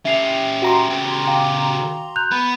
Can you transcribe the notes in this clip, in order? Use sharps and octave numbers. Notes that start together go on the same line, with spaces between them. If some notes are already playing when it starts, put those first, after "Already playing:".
C#4 G4 E5 C7 F7
F#4 A#5 C6
C#3 G4
F5 G5 D6
F#6 G6 F7
B3 B5